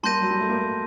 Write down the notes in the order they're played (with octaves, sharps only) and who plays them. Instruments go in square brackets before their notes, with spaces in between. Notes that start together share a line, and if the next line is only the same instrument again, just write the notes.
[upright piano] G3 A#3 [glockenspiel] A5 C6 G6 A#6 D#7
[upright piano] F#3
G3
A3
G3 A#3